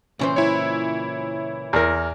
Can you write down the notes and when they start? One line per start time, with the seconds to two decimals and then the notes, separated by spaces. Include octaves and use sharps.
0.19 C#2 A#2 E3 C#4 C5 C6
0.36 E4 C#5
1.73 E2 A#4 A#5